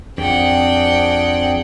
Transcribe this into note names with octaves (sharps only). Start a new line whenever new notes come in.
F2 C4 D4 G#4 F#5 G5